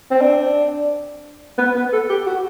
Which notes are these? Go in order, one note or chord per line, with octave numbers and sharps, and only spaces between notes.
C4
D4
B3
B3
A4
G4
F#4